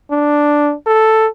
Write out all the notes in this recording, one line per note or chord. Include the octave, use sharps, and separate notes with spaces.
D4
A4